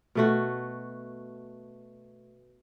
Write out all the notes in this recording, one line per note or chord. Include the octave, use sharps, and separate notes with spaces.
B2 A3 F#4